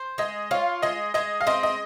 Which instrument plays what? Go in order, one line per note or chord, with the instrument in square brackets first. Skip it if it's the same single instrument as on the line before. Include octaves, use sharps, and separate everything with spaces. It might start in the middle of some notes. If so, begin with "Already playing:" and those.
Already playing: [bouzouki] C5
[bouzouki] G#3 [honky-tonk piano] D#5
[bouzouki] F4 [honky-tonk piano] C#5 F5
[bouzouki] G#3 [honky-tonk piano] D#5
[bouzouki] G#3 [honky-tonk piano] D#5
[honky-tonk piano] F5
[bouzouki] C4 [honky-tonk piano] D#5
[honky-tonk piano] D#5